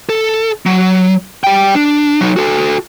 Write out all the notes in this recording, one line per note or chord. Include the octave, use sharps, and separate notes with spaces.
A4
F#3
G3 G5
D4
F#3 D#4
F#4 A4